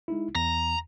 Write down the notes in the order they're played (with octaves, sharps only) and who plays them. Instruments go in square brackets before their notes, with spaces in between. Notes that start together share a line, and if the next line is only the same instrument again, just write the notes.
[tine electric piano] G#3 D#4 E4
[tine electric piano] E2 [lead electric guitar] A#5